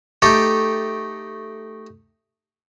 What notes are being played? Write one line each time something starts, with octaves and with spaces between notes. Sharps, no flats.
A3 D#4 G4 A4 G5